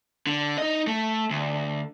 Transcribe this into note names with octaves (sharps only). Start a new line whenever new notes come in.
D3
D#4 D#5
A3
D2